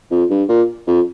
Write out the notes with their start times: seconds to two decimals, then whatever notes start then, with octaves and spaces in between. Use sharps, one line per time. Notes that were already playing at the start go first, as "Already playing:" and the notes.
0.11 F2
0.30 G2
0.49 A#2
0.87 F2